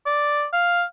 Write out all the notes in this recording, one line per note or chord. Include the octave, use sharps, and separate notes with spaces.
D5
F5